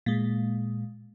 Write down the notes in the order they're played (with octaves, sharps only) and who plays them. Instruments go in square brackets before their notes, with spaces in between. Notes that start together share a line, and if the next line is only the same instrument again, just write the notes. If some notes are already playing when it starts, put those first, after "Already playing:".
[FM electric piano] A#2 G#3